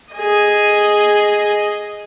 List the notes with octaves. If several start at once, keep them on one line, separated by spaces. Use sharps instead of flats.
G#4 D#5